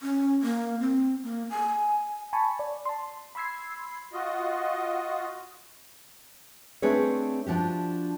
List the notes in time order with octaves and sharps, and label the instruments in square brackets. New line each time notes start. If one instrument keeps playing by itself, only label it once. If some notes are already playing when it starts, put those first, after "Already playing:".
[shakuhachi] C#4
A#3
C4
A#3
G#5
[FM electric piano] G#5 A5 B5 C#6
D5
A5 C6
B5 C6 E6 G#6 C7
[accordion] F4 F#4 D#5
[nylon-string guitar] A3 C4 D4 G#4 B4 C#5
F3 D4 F#4 G4